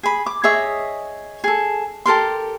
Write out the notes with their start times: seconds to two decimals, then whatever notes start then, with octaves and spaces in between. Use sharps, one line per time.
0.03 G#4 B5
0.26 D6
0.44 G#4 C#5 D#5 E5
1.44 G#4 A4
2.06 G4 A4 A#4 C6